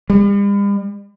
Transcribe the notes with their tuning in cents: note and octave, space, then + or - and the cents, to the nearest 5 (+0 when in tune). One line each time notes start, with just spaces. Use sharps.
G3 +45